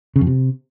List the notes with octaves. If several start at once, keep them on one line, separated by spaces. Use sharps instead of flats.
C#3
F2
C3